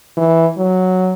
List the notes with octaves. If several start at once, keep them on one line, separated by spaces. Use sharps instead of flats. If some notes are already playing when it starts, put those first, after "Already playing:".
E3
F#3